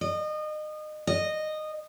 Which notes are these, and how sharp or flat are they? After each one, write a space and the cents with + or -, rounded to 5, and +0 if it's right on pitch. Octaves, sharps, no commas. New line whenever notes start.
D#5 -30
D#5 -15